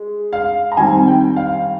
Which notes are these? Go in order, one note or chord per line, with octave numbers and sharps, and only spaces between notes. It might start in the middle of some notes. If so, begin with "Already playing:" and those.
Already playing: G#3
F5
A#5
D#3 G3 C4 G#5
G5
F5